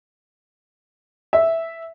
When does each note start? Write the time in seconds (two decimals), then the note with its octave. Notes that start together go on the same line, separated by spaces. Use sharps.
1.33 E5